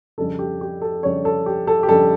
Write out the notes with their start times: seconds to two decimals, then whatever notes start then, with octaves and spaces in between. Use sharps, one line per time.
0.18 F2 C#3 G3 D4 A4
0.39 G4
0.61 G4
0.82 A4
1.03 F2 C#3 G3 D4 C#5
1.25 A4
1.46 G4
1.67 A4
1.83 G4
1.89 F2 C#3 G3 D4 A4